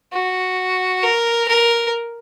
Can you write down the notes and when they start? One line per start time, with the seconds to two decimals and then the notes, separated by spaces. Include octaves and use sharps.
0.13 F#4
1.03 A#4
1.48 A#4